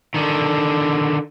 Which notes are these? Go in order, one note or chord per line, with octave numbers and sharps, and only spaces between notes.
D3 D#3